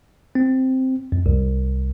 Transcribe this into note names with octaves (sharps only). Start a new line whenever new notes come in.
C4
F2
C2